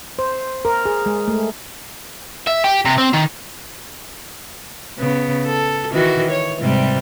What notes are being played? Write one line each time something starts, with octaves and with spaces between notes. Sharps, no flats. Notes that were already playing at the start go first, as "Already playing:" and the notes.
C5
A#4
G#4
G#3
A3
E5
G4
C3
C4
D#3
C#3 B3
A4
D#3 E3 F#4
C#5
G#2 C3 G3